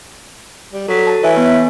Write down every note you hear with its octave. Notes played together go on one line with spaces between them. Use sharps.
G3
F#3 A4 B6
A5
E3 C#5 E5 G#5
B3